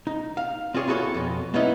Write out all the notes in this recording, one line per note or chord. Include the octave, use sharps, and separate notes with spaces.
D#4
F5
C4 F4 G4 G#4 C#5
E4 F#4 G#4 A4 C#5
F2 B2
A#3 B3 C#4 D#4 E4 D#5